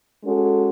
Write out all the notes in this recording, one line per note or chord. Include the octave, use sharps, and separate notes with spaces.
G#3 C#4 F#4 A4